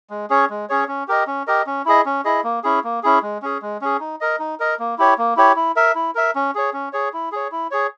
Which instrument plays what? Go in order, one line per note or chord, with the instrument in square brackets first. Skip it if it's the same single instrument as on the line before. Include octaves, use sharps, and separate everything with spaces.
[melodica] G#3
C#4 G#4 C#5
G#3
C#4 G#4 C#5
C#4
G4 A#4 D#5
C#4
G4 A#4 D#5
C#4
E4 G#4 D#5
C#4
E4 G#4 D#5
A#3
C#4 E4 G#4
A#3
C#4 E4 G#4
G#3
C#4 G#4
G#3
C#4 G#4
D#4
A#4 D#5
D#4
A#4 D#5
A#3
E4 G4 C#5
A#3
E4 G4 C#5
E4
A#4 E5
E4
A#4 E5
C#4
G#4 C#5
C#4
G#4 C#5
E4
G#4 C#5
E4
G#4 C#5